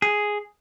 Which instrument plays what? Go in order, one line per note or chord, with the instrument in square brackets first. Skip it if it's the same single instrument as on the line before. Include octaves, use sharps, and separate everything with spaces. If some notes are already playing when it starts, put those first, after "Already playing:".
[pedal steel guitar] G#4